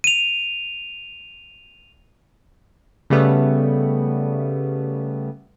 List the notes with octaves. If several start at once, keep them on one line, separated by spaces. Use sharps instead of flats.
D#7 F7
C#3 G3 A3 B3